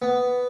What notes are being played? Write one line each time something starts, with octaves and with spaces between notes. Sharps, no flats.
B3